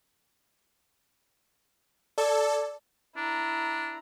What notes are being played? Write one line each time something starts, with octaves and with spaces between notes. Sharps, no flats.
A4 D5 D6
D4 E4 A#5